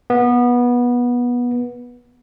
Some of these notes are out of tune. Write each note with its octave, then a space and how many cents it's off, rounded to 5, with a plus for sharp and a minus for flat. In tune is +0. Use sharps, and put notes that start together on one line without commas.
B3 -20